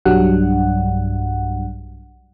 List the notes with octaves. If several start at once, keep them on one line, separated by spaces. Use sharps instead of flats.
B1 G2 F#3 G3 D4 F#5